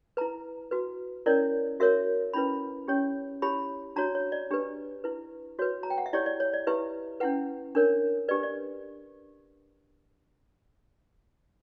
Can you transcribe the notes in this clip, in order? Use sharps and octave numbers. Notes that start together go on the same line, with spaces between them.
E4 B4 A#5
F#4 B4
C#4 E4 A#4 C#5 D5
F#4 A#4 C#5 E5
C#4 E4 B4 B5
C#4 G4 C#5
E4 G4 C#5 B5
D4 F#4 C#5 A#5
C#5
D5
D4 G4 B4
E4 B4
F#4 B4 C#5
A#5
G5
F#5
E5
E4 G4 C#5 D5
D5
C#5
D5
E4 G4 B4 E5
C#4 E4 B4 F#5
D4 A#4 C#5
D4 G4 B4 D5
D5